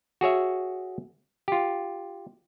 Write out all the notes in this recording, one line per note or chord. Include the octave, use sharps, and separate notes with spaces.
F#4 G#4 C#5 E5
F4 G4